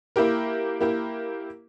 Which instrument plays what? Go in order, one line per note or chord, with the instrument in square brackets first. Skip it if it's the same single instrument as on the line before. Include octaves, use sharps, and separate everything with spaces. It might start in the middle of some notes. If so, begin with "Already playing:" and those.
[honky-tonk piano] A#3 E4 G4 A#4
A#3 E4 G4 A#4